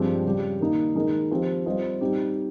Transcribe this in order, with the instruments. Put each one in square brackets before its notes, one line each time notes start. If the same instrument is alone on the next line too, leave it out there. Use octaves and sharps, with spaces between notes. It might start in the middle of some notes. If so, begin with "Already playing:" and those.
Already playing: [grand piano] G2 F3 G#3 C4 G4
C#3 G3 C#4 G4
D#3 A#3 D#4
D#3 G#3 D#4 A#4 D#5
F3 C4 G4 C5
G3 C4 F4 C5 D#5
G3 C4 D#4 G4